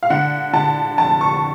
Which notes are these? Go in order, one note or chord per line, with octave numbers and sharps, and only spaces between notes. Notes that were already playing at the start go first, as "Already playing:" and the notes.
F5
D3 F#5
D3 A5
F1 A5
C#6